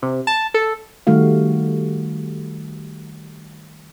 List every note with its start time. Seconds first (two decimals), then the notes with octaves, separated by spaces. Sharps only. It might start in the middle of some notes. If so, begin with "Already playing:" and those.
0.03 C3
0.27 A5
0.54 A4
1.07 D#3 G3 A3 F#4 F5